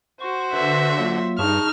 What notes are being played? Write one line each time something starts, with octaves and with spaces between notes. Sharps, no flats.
F#4 C5 C#6
D3 B4 E5
F#3 A#3 F4
G2 D#4 G#4 A5 C#6 F6